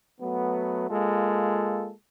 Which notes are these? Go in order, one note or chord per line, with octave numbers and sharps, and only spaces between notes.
F#3 A3 B3
G#3 A#3 F4 A4